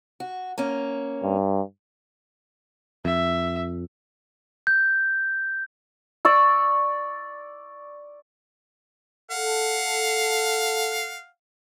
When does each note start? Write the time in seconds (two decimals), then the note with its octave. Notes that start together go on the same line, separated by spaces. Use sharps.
0.20 F#4
0.58 A#3 C#4
1.23 G2
3.05 F2 E5
4.67 G6
6.25 D5 C#6 E6
9.31 A4 F5 F#5